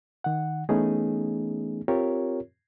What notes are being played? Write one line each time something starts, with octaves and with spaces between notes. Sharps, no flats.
D#3 F#5
E3 A3 B3 C#4 D#4 G#4
C4 F4 G4 A#4 C#5